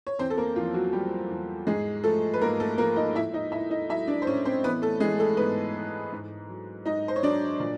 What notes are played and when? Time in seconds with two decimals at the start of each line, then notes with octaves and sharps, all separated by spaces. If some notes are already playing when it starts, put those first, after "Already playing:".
0.07 C#5
0.19 E2 C4 C5
0.30 A4
0.37 A#3 A#4
0.56 E2 F3 F4
0.74 F#3 F#4
0.93 F#3 G3 G4
1.30 E2
1.67 G#2 G#3 G#4
2.04 F3 A3 A4
2.34 B4
2.41 G#2 A#3 A#4
2.60 A3 A4
2.78 F3 A#3 A#4
2.96 D#4 D#5
3.15 A2 E4 E5
3.34 D#4 D#5
3.52 A2 E4 E5
3.71 D#4 D#5
3.89 F#3 E4 E5
4.07 D4 D5
4.22 C5
4.26 A2 C#4 C#5
4.45 C4 C5
4.64 E3 B3 B4
4.82 A3 A4
5.00 E3 G#3 G#4
5.19 A3 A4
5.37 G#2 B3 B4
5.75 E3
6.12 G#2
6.49 F#3
6.86 G#2 D#4 D#5
7.08 C5
7.16 C#5
7.23 F#3 D4 D5
7.60 A#2